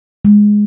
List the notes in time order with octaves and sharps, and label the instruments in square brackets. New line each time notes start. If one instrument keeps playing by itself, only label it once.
[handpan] G#3